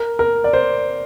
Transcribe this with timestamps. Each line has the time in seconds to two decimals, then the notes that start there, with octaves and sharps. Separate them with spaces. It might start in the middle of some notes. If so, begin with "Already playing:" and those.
Already playing: A#4
0.19 A#4
0.44 D5
0.53 C5